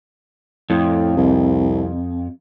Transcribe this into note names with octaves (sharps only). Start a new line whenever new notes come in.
F2 A2
C2